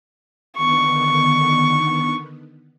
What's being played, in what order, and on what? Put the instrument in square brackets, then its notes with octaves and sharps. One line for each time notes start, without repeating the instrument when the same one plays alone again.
[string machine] D3 D#3 B3 [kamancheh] C#6